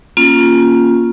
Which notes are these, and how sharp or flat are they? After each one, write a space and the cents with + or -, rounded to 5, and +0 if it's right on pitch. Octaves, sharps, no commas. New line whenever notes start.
A#3 +15 C#4 +0 F4 +0